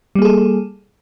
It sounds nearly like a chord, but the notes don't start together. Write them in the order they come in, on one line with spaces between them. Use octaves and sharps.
G3 A#3 G#4 A4